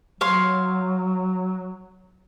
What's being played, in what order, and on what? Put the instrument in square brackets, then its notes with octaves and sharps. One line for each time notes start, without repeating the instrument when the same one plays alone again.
[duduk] F#3 [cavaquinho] C#5 F5 C6